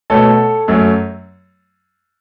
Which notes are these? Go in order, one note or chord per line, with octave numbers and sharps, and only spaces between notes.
B2 A3 A4 C#5
F#2 F#3 A3